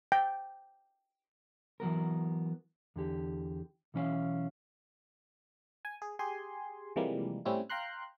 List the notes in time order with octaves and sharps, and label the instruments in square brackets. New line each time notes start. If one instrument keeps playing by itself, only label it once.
[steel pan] G5
[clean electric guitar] E3 F#3 B3 A#4
E2 D3 G4
B1 E3 C#4 E4 E5 F5
[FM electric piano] G#5
G#4
G4 G#4 G#5 C6
C3 E3 F3 G3 G#3 A#3
A2 G3 C4 C#4 E4
F5 G5 A#5 C6 F#6